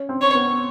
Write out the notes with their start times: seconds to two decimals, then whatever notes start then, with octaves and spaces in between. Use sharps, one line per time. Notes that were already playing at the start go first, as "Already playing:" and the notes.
Already playing: C#4
0.09 C4
0.21 C#5
0.35 B3